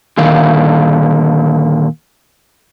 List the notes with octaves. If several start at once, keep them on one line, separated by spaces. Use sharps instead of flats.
A#2 D3 D#3 F5